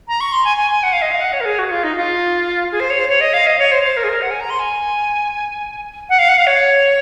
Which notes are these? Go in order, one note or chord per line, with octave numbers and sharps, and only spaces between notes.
A#5
C#6
C6
G#5
G#5
G#5
F#5
F5
D#5
F5
F#5
C#5
A#4
G#4
F#4
F4
D#4
F4
G#4
C5
C#5
C5
C#5
D#5
F5
D#5
C#5
C5
C5
A#4
G#4
A#4
F#5
G#5
A#5
C6
G#5
F#5
F5
F#5
F5
C#5